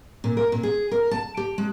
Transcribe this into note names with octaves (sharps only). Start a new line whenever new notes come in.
A#2
A#4
A#2
G#4
A#4
A5
G4
G#3